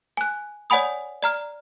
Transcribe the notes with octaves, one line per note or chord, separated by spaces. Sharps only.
G#5 F#6
C#5 D5 F#5 G#5 B5 D#6
D5 A#5 F6